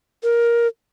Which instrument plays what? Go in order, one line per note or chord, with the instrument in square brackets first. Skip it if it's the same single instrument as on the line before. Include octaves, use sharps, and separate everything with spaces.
[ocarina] A#4